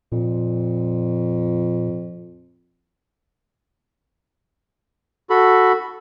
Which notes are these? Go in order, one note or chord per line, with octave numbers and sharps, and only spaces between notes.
F2 A#2
F#4 A4 B5